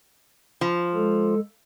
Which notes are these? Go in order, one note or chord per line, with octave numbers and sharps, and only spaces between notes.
F3
G#3 A4